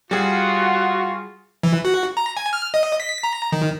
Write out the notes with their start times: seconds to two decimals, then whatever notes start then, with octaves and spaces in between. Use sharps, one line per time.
0.11 G3 F4 F#4 G#4
1.63 E3
1.85 F#4
2.17 A#5
2.37 G#5
2.53 F6
2.74 D#5
3.00 B6
3.23 A#5
3.52 D#3